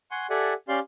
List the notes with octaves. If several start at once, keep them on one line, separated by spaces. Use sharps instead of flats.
F#5 G#5 C6 C#6
G4 A4 D5 E5 F#5 G#5
C#4 G4 D5 F5 C6